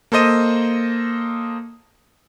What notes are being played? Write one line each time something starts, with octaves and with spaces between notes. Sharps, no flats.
A#3 A4 C5 D#5 D#7